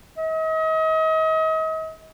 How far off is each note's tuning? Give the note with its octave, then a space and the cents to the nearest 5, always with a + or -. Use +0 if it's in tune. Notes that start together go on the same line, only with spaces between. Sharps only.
D#5 +40